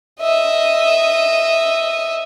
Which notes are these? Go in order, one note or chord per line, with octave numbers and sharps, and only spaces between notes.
D#5 E5